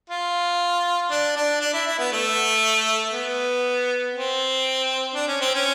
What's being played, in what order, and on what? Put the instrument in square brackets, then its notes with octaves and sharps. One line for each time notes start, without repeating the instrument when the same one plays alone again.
[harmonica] F4
D4
D4
D4
E4
E4
B3
A3
B3
C4
D4
C#4
C4
C#4